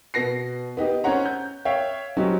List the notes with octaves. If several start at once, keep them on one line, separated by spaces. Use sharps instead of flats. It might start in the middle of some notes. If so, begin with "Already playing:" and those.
B2 B3 A#6 C7
B3 D#4 G4
C#4 C5 C#5 F#5 A#5
G6
C#5 E5 F5 G5
F#3 C4 C#4 D#4 G4